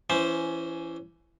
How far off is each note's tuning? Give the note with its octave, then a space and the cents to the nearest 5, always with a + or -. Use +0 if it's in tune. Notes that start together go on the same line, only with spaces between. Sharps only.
E3 +25 C#4 +15 C5 +0